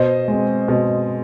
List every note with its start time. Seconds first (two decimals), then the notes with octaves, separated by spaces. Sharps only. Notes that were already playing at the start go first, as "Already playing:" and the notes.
Already playing: B2 C5 D#5
0.28 G#3 C4
0.68 B2